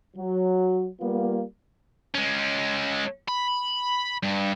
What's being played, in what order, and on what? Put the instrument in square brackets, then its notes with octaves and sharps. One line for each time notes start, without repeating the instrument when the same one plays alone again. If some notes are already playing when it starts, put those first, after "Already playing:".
[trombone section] F#3
G3 A#3 B3 F4
[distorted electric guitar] G#3 C#4
B5
G2